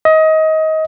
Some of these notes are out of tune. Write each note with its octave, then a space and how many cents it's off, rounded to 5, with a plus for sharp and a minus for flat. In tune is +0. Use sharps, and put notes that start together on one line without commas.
D#5 +25